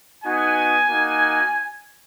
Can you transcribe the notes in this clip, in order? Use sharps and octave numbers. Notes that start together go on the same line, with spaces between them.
B3 D#4 F#4 G#5
A#3 D#4 F#4